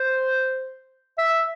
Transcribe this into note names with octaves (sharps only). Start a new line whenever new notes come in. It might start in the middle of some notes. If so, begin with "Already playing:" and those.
Already playing: C5
E5